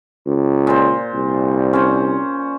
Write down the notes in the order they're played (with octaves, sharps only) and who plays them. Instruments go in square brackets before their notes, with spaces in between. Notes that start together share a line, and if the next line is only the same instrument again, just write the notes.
[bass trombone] C#2
[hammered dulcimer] A#2 C5
[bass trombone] C2
[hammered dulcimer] C#4 C5